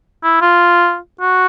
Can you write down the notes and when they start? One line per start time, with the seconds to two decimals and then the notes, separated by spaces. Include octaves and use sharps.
0.23 E4
0.42 F4
1.21 F#4